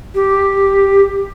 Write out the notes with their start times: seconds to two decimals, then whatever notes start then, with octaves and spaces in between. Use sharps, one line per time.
0.15 G4